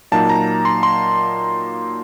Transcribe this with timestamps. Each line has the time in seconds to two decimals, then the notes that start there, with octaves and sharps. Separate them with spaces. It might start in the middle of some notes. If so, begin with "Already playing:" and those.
0.12 A#2 F#3 A#3 D#4 A5
0.29 A#5
0.65 C6
0.83 C6